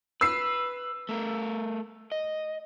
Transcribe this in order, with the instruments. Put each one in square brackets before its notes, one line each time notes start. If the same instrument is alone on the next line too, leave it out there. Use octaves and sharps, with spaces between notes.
[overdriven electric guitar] B4 [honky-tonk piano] E6 C7
[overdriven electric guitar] A3 A#4
D#5